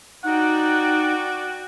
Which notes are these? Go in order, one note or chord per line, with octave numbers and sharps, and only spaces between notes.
D#4 F#4 D5 F#5 G5